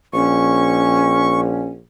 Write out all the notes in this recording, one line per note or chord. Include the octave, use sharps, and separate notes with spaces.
A#1 C#4 C#6